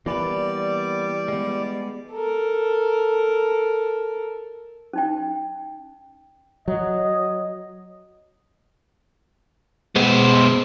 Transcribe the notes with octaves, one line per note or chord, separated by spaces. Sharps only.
E3 G3 A#3 B3 B4 D5
G#3 B3
A4 A#4
C#4 D#4 G5
F#3 D#5
B2 G#3 B3 C5